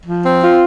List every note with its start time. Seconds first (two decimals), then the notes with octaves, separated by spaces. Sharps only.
0.06 F3
0.23 C4
0.41 F4